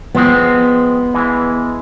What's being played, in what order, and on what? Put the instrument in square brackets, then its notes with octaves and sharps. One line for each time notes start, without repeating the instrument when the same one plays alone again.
[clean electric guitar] F3 G#3 C4 [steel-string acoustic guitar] B3
[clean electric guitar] E3 G#3